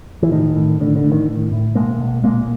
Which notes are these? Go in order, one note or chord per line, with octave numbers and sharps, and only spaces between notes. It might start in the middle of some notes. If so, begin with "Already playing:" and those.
E3
A2 D#3
A2
A2 D3
D3
A2
D#3
A2
A2
B2 G#3 A#3
B2
A#2 G#3 A#3